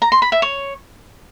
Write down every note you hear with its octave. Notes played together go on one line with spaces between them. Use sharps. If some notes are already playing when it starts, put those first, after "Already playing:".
A#5
C6
B5
E5
C#5